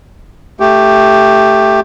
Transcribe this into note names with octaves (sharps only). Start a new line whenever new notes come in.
A3 G4